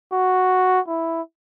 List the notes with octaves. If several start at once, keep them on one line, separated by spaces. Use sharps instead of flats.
F#4
E4